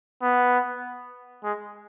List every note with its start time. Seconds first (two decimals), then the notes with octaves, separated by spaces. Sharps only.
0.22 B3
1.43 G#3